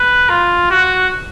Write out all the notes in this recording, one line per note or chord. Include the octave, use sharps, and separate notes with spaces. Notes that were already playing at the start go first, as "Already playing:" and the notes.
Already playing: B4
F4
F#4